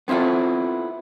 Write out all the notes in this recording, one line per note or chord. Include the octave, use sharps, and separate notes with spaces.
B3 C4 E4 F4 A4